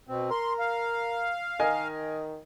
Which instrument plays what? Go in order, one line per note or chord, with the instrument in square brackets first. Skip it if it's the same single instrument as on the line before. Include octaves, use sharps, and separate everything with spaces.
[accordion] B2 C4
[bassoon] A#4 [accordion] C6
[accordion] F5
[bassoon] D#3 [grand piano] A#4 D#5 G#5